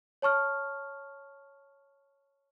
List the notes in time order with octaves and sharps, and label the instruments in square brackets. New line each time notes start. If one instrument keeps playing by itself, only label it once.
[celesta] C#5 A5 C#6 F6